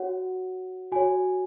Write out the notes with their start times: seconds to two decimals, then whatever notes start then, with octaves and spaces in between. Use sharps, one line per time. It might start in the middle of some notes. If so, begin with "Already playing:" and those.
Already playing: F#4 C#5 F#5
0.92 F#4 C#5 G#5